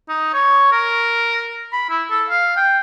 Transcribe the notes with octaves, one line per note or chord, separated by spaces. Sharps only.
D#4
C#5
A#4
B5
E4
A4
F5
G5